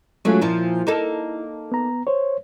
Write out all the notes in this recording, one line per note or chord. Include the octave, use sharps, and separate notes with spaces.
F#3 G#3 A3 C#4 F4
A#2 F3 E4
A#3 D#4 A4
B3 A#5
C5 C#5